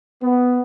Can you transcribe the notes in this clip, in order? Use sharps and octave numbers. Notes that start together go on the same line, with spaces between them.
B3